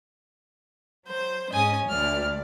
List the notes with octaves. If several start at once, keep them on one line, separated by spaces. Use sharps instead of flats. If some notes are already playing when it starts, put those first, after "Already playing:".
F#3 C5 G6
G#2 C#4 D#5 G#5 D#6
D2 D5 F6